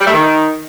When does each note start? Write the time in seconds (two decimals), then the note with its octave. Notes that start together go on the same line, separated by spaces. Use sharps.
0.01 G3
0.07 A3
0.13 D#3